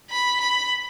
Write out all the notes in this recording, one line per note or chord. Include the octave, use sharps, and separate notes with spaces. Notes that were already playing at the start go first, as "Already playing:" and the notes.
B5
B5